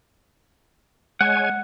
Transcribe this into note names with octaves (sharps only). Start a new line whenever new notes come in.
G#3 C#5 F#5 G#5